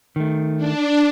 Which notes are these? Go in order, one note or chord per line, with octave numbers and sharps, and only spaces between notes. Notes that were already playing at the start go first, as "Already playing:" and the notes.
D#3 A3
D4